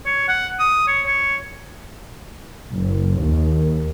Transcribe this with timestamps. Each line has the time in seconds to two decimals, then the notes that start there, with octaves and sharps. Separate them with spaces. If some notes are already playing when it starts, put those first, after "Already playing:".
0.06 C#5
0.28 F#5
0.59 D#6
0.88 C#5
1.06 C#5
2.70 F#1
3.20 D#2